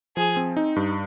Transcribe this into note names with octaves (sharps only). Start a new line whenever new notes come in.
F3 G#4
C4
D#4
G2